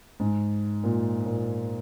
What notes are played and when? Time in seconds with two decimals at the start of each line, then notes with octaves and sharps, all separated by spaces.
0.20 G#2
0.84 A#2
1.26 A#2